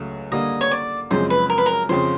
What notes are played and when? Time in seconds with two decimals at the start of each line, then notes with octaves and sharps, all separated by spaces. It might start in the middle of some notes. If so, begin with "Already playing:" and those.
Already playing: C#2 C#3 F#3 A3
0.32 D3 G3 A#3 D#5
0.61 C#5
0.71 D5
1.11 F#2 C#3 F3 G#3 C4 C5
1.30 B4
1.50 A#4
1.58 B4
1.66 A#4
1.89 F2 C#3 F3 C5